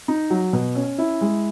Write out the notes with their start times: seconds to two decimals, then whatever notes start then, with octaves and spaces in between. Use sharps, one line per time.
0.08 D#4
0.31 F#3
0.53 B2
0.75 C#4
0.98 E4
1.21 G#3